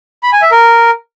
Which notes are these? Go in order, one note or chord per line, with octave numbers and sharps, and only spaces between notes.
B5
G#5
E5
A#4